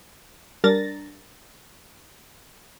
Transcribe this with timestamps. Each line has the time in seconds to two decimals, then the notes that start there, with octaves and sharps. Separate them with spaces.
0.64 G3 D4 A#4 A6 A#6